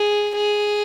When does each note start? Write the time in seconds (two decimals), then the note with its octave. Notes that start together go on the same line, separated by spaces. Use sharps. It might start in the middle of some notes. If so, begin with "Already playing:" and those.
Already playing: G#4
0.36 G#4